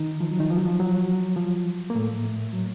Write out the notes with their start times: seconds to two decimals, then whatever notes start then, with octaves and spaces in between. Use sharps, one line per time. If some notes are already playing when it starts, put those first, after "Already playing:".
Already playing: D#3 D#4
0.21 F3
0.31 F#3
0.40 D#3 D#4
0.50 F3
0.57 F#3
0.65 F3
0.80 F#3
1.37 F3
1.90 A#3
1.95 A2 A3
2.53 F#3